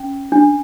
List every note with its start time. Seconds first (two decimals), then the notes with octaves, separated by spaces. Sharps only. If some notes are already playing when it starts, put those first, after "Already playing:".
Already playing: C#4
0.32 D4